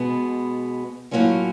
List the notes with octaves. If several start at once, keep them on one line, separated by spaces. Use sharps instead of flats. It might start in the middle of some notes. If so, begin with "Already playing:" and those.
Already playing: B2 G#3 B3
A2 F#3 A#3 C#4 F4